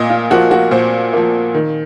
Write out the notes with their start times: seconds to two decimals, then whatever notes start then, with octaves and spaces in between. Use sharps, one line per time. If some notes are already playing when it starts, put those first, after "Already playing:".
Already playing: A#2 D#5
0.10 F4
0.31 F3 A#3 F#4
0.51 F#4
0.71 A#2 C5
1.13 F3 A#3
1.54 D#3